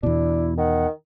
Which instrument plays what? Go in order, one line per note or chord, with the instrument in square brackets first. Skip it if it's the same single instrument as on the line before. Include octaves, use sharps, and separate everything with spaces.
[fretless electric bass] E2 B2 [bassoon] D4 [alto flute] E4
[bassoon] D#3 [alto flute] F#5